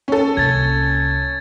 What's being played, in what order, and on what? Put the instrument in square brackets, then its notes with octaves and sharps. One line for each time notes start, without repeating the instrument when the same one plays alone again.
[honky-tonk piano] C#4 A4
[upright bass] C2 A#3 [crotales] G#6 A6